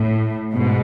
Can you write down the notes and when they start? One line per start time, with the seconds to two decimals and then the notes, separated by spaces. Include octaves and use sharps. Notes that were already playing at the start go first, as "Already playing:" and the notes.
Already playing: A2
0.52 G#2 B2